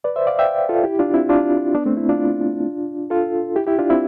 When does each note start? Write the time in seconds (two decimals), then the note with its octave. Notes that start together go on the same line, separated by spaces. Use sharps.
0.04 B4 D5
0.16 C5 E5
0.27 D5 F5
0.39 E5 G5
0.69 F4 A4
0.83 E4 G4
0.99 D4 F4
1.14 C4 E4
1.29 D4 F4
1.75 B3 D4
1.86 A3 C4
1.97 C4 E4
2.09 D4 F4
3.10 F4 A4
3.56 E4 G4
3.67 E4 G4
3.79 D4 F4
3.90 C4 E4